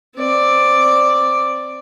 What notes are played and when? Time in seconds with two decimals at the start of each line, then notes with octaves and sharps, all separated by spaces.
0.16 C4 D5